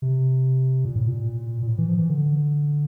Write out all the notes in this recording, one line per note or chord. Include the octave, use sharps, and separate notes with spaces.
C3
A#2
A2
A#2
A#2
A2
E3
F3
E3
D3